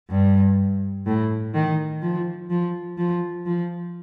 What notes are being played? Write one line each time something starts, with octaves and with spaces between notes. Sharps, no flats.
G2
A2
D#3
F3
F3
F3
F3